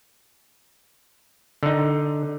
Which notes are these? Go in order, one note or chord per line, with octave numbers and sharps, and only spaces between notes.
D3 D#4